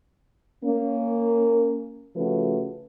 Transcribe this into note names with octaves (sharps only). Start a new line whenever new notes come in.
A#3 C#4
C#3 F3 A3 C#4 F#4 B4